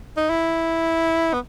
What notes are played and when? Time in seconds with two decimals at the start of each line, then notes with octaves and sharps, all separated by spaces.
0.17 D#4
0.29 E4
1.33 B3